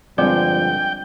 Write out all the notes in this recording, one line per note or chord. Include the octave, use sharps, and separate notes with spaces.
G2 D3 F3 G3 G#3 C4 D5 G5